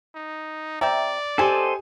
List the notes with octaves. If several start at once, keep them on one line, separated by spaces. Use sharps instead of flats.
D#4
C3 D5 E5 G5 A#5
C4 G4 A4 C5 D#5 G#5